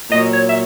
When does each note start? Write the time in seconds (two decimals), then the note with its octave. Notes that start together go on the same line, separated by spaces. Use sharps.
0.10 A#2 F#3 D#5
0.33 C#5
0.48 E5